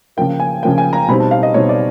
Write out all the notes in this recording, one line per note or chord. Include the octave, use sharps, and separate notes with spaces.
C#3 F3 A#3 G5
G#5
C#3 F3 A#3 G5
G#5
A#5
B2 G3 C4 D#4 B5
A5
F5
D#5
B2 G3 C4 D#4 C#5
D5